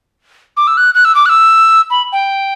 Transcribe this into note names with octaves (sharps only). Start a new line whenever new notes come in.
D6
E6
F#6
F#6
E6
D6
F#6
E6
B5
G5